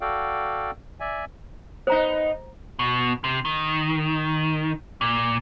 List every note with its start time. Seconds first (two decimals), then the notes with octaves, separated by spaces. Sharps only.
0.01 F#4 A4 D5 F5 G5
1.00 D5 E5 G#5
1.87 B3 D#4 C5 A#5
2.79 B2
3.24 C3
3.45 D#3
5.01 A#2